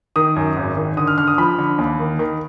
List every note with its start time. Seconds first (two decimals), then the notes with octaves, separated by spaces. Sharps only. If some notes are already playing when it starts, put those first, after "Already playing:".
0.16 D#3 D#6
0.36 F#2
0.57 G#1
0.77 D#3
0.97 D3 D#6
1.07 F6
1.18 D3 F6
1.27 D#6
1.38 F3 B5
1.58 D3
1.78 D#2
2.00 D#3
2.19 D#3